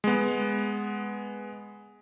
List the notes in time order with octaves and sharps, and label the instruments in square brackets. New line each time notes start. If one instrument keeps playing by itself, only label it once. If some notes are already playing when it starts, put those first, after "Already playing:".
[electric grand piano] G#3 B3